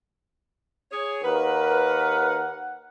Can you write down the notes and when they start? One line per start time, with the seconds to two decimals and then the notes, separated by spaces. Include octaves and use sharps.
0.91 G#4 C#5
1.24 D#2 A#4 B4 F#5